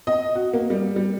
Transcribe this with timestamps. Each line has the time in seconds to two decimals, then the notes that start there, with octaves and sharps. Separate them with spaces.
0.07 D#5
0.35 F#4
0.53 A#3
0.70 G3
0.96 G3